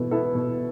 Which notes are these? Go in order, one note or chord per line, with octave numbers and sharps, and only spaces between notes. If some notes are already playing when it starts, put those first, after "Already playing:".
Already playing: B2 B3 E4 A4
B3 E4 A4
B2